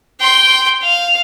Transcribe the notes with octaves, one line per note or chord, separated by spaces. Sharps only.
G5 C6
F5